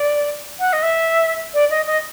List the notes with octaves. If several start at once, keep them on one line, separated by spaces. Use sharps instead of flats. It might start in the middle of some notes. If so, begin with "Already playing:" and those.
Already playing: D5
F#5
D#5
E5
D5
D#5
D#5